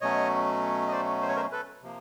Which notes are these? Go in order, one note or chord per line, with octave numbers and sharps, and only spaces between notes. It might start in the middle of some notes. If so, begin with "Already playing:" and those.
B2 F#3 A3 C#4 C#5 D#5
D#5
C5 D5
C5
C#5
A#4 C5
A4 B4
C3 F3 A#3